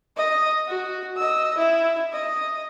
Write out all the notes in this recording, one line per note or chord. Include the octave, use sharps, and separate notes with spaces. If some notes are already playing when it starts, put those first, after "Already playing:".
D#5
F#4
D#5 E6
E4
D#5